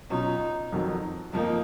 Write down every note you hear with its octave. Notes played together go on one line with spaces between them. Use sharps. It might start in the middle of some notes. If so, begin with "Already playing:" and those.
B2 F#3 C#4 D#4 F4
F2 D#3 F#3
F2 F3 A#3 D#4